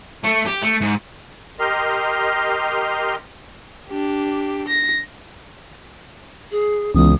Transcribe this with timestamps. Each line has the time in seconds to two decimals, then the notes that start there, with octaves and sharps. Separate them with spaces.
0.24 A3
0.46 G4
0.62 A3
0.82 G#2
1.59 G4 A#4 D#5 C6 F6
3.89 D4 G4
4.68 A#6
6.51 G#4
6.95 C#2 E3 B3 C#4 D#6